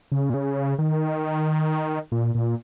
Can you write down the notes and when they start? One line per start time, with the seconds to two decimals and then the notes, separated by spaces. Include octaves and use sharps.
0.12 C#3
0.30 A#2
0.34 C#3
0.79 D#3
2.12 A#2
2.35 A#2